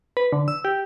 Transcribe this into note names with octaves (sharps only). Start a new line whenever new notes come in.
B4
D3
E6
G4